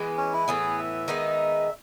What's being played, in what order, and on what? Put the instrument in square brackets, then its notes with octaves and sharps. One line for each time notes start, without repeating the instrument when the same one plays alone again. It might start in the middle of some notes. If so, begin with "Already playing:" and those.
Already playing: [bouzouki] E3 G#3 B3
[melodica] C#4
E4
[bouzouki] A2 E3 B3 [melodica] G#4
[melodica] E5
[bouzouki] D#3 G#3 B3 D#4